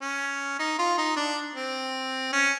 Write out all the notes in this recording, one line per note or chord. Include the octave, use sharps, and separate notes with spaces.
C#4
D#4
F4
D#4
D4
C4
C#4